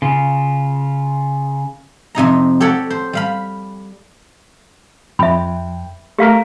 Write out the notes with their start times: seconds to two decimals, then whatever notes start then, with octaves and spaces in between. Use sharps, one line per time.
0.02 C#3 F4
2.15 F2 C3 D#4 A#5
2.60 G4 A4 C#5 D5 F#5
2.90 C5
3.13 G3 F5 B5
5.19 F2 E5 G5 B5
6.19 A3 G4 A#4 F5